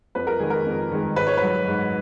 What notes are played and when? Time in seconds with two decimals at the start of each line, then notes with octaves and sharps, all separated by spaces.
0.15 F2 B4
0.27 A#4
0.39 D#3 G#3 G#4
0.50 A#4
0.66 F2
0.91 D#3 G#3
1.16 G#2 B4
1.27 C#5
1.37 F#3 B4
1.67 G#2